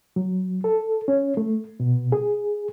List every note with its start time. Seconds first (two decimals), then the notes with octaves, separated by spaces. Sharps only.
0.16 F#3
0.64 A4
1.08 C#4
1.37 A3
1.80 B2
2.12 G#4